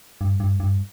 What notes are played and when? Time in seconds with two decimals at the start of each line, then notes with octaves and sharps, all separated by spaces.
0.21 G2
0.40 G2
0.60 G2